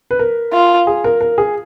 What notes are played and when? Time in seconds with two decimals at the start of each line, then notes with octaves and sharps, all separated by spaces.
0.11 B4
0.19 A#4
0.53 F4
0.87 G#4
1.04 A#4
1.21 A#4
1.38 G#4